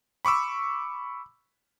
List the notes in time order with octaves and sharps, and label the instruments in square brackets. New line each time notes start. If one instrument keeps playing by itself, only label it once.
[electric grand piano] B5 C#6 D6 E6